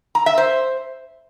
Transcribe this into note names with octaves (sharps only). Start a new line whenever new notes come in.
A#5
E5
C5